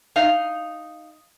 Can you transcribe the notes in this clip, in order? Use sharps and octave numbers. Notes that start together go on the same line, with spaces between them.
D#4 F5